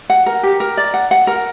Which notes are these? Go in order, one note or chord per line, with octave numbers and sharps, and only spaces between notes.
F#5
A#4
G4
A#4
D5
F#5
F#5
A#4